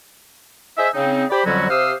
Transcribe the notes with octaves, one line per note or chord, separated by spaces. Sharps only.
G#4 C5 D#5 E5
C#3 C4 D#4
G4 C5 D5 B5
F2 D3 F#3 G3 C#4 F#4
C3 G4 C5 F5 D#6 E6